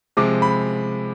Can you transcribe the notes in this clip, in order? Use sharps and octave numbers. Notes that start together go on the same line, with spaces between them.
C3 F3 G#3 D6
B5